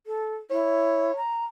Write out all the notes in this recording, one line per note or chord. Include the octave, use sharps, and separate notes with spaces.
A4
E4 C#5
A#5